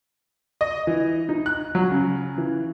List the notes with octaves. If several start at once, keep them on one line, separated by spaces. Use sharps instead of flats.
D#5
E3
D#4
F#6
F#3
C#3
E3